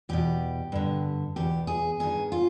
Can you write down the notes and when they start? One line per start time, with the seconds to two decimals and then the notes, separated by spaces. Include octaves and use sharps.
0.09 E2 B2 G4
0.72 G2 D3
1.36 E2 B2 G4
1.67 G#4
2.00 G2 D#3 G#4
2.32 F4